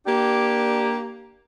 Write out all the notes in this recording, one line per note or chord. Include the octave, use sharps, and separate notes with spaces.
A#3 D4 G4